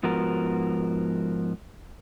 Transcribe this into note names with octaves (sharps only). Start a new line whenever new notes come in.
G#2 F3 B3 F#4 A#4